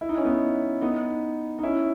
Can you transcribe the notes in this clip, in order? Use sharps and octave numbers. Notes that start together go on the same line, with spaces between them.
E4
D#4
C#4
B3 D#4
B3 D#4
D#4
C#4 E4